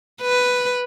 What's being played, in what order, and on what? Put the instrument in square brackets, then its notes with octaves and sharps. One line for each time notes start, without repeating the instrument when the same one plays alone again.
[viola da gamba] B4